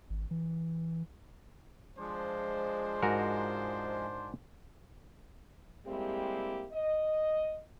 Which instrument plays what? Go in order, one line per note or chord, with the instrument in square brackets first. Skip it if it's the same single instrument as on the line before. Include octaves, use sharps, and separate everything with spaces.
[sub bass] G#1
E3
[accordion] F3 G#3 [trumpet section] D4 C5
[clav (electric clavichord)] G#2 F#4 A#4
[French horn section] G3 G#3 A#3 C4 E4 G4
D#5